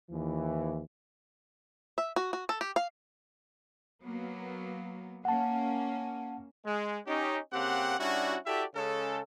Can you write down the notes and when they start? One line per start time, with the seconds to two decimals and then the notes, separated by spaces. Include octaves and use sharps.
0.10 D#2 E3
1.98 E5
2.16 F#4
2.33 F#4
2.49 A4
2.61 G4
2.76 F5
4.03 F#3 A#3 B3
5.25 A#3 C#4 F#5 A5
6.65 G#3
7.07 C#4 D#4 G4
7.53 C#3 A#3 C4 G4 F#5
8.00 G3 C#4 D4 E4 F#4
8.46 E4 F#4 G4 A4 D5 E5
8.75 C#3 G#3 C#4 A4